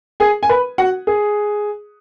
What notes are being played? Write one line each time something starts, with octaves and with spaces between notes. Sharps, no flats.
G#4 G#5
G#5
B4 B5
F#4 F#5
G#4